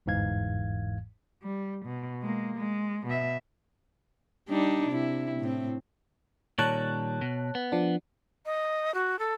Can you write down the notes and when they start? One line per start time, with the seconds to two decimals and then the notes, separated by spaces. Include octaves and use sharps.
0.06 G1 E2 G#2 E3 F5 G#6
1.42 G3
1.85 B2
2.22 G#3 A#3
2.57 G#3
3.07 B2 E5
4.49 G3 D4 D#4
4.89 C3 E4
5.40 A2 C4
6.59 A#2 D#3 G3 C#5 A5 F#6
7.21 B2
7.55 B3
7.72 F3 D4
8.46 D#5
8.94 F#4
9.19 A4